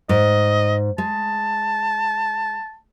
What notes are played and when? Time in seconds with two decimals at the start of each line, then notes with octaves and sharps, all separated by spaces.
0.09 G#2 D#5
0.98 G#3 A5